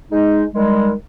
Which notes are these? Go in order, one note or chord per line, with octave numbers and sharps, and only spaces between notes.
G#3 D#4
D#3 G3 G#3